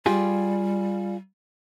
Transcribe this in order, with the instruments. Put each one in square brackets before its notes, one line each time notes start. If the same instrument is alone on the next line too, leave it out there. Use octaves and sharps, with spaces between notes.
[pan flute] G3 [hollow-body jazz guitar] F4 G4 G#4